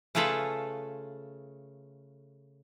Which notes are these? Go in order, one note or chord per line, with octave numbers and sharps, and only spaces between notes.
C#3 A3 F4 G#4 A4 B4